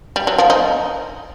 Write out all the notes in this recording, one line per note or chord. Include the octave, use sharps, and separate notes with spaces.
G3
F#3
F3
D#4